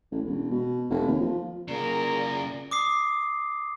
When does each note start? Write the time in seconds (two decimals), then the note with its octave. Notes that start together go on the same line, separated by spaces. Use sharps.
0.12 A1
0.26 E1
0.51 B2
0.90 F1
1.07 D#2
1.20 F3
1.68 C#3 A#3 F4 G#4 A#4 D5 A#5
2.71 D6 D#6 C7